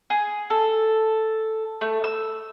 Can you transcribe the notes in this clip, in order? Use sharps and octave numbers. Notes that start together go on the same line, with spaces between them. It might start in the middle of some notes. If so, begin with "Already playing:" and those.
G#4
A4
A3
E6